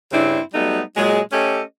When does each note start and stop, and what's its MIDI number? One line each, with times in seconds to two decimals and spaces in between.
0.12 0.39 43
0.12 0.39 49
0.12 0.39 60
0.12 0.39 62
0.12 0.39 64
0.54 0.81 54
0.54 0.81 55
0.54 0.81 57
0.54 0.81 59
0.54 0.81 63
0.96 1.21 46
0.96 1.21 54
0.96 1.21 56
1.32 1.61 57
1.32 1.61 61
1.32 1.61 67
1.32 1.61 69
1.32 1.61 75